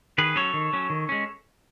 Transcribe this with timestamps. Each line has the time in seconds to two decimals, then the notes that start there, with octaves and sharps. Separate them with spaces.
0.18 D#3 G#4 B4
0.36 F#3 C#4 A4 C#5
0.54 D#3
0.73 F#3 C#4
0.90 D#3
1.09 G#3 C#4